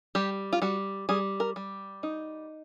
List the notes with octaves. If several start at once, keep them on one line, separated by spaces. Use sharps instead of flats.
G3 G4
F4
G3 F#4
G3 G#4
A#4
G3
D#4